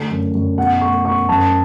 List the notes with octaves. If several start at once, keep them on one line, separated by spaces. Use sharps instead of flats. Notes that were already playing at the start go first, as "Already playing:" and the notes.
Already playing: D3 A3
F#2
F#2
B2 F#5
A3 C#6
B2 C#6
F#2 A5